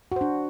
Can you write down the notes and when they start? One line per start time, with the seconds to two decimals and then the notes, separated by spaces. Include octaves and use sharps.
0.12 F#4
0.16 C5
0.21 D4